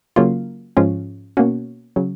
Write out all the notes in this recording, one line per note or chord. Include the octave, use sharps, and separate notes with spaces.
C#3 F#3 A#3 F4
G#2 F3 G#3 C#4 F4
B2 A#3 C#4 F#4
C#3 F#3